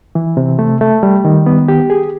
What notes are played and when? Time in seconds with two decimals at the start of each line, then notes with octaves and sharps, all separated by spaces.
0.15 E3
0.37 C3
0.59 A3
0.81 A3
1.03 G3
1.25 D#3
1.46 B3
1.68 G4
1.90 G#4